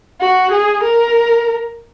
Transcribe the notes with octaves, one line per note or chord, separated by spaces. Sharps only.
F#4
G#4
A#4